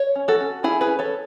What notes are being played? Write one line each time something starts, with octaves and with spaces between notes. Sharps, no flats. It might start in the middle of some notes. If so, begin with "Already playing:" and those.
Already playing: C#5
C#4
F#4 A4
C#4
C#4 E4 G#4
G#4 B4
C#4
A4 C#5